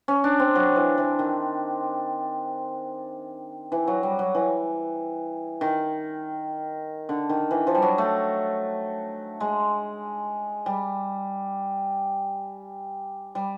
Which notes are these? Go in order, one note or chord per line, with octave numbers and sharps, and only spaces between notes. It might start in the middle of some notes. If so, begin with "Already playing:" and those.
C#4
D4
C4
F#3
E3
E3
D#3
E3
F#3
G3
F#3
E3
D#3
D3
D#3
E3
F3
G3
F#3
A3
G#3
G3
G3